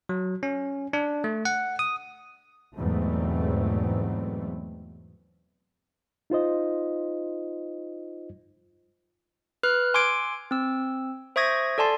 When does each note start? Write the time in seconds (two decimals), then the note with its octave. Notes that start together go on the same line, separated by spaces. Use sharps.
0.09 F#3
0.43 C#4
0.93 D4
1.24 A3
1.45 F#5
1.79 D#6
2.74 E2 G#2 B2 F#3 A3 C4
6.30 D#4 F4 C5 D#5
9.63 B4 F6 F#6
9.94 G#5 C6 D6 E6 G#6 D7
10.51 C4 E6
11.36 C5 E5 C#6 D#6 G#6 A#6
11.78 A4 D5 G#5 A5 C6